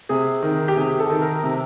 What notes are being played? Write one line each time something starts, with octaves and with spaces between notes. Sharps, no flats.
C3 G#4
D#3
G4
C3 G#4
A4
D#3
A#4
C3